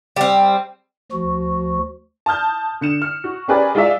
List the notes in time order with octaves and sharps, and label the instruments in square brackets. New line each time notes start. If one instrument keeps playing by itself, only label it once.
[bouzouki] G3 C4
[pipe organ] D2 F3 F#4
[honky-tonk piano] A5 D#6 F6 G6
D3 C#7 E7
F6
F#4
C#4 G4 G#4 A#4 B4 D5
G#3 F4 G#4 D5 E5 F5